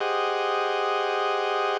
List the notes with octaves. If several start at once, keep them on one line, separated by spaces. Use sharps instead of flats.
G4 G#4 C5 D#5 F#5